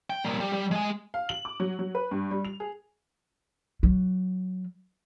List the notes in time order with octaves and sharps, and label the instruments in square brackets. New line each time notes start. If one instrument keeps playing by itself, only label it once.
[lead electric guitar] G5
G3 A#3
G3
G3
G#3 G#5
[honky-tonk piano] F5
F#7
D6
F#3
F#3
B4
G2
G3
F7
G#4
[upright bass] F#3